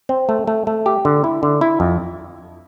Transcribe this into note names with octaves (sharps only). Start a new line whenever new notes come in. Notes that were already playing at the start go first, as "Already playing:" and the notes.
C4
A3
A3
A3
G4
D3
E4
D3
E4
F2